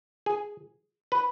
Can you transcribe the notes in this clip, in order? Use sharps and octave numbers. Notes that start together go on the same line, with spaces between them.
G#4
B4